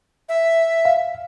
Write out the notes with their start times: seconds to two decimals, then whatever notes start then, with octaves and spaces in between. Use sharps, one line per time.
0.29 E5
0.85 F5